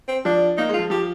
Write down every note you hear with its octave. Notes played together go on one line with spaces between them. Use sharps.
C4
F3 D4
A#3 D#4
G#3
F4
F3
F3 G4